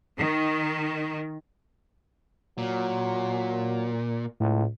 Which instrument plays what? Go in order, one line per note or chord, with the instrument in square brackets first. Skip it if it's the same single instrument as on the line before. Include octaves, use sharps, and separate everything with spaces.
[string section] D#3
[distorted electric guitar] A#2 [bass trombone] F#3
[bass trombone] C#2 [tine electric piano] A2